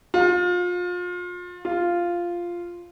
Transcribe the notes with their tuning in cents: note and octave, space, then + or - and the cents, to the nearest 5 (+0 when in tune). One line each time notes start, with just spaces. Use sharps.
F4 +30
F4 -5